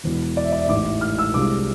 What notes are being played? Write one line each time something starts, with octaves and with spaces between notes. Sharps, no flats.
E1 E2 B2
D5
E5
D5
E5
A1 G#2 E3 D6
F6
E6
C2 C3 G#3 D4 F4 D6